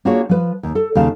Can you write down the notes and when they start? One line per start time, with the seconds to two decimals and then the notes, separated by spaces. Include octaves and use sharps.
0.05 A#3 D4 F4 F#4 G#4 C#5
0.29 F3 B4
0.63 D#2
0.75 A4
0.95 D#2 C#3 F5 A5